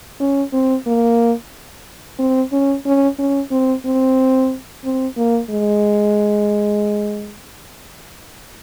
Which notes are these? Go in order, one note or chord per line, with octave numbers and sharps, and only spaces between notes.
C#4
C4
A#3
C4
C#4
C#4
C#4
C4
C4
C4
A#3
G#3